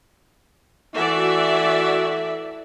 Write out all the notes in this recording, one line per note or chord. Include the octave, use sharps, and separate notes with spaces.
E3 A3 F#4 D5 E5